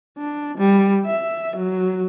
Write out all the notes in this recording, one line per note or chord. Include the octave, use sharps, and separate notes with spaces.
D4
G3
E5
F#3